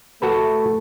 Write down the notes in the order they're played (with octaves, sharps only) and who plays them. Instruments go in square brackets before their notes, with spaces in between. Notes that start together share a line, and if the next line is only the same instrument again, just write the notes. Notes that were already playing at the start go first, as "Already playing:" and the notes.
[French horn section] A3 [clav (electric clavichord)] F#4 A4 B4